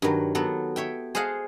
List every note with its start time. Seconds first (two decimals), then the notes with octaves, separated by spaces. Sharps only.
0.02 G2 D#3 F#3
0.35 F#3 B3 A4
0.76 C#5 E5 G5
1.15 G#4 C5 D#5 F5 F#5 A5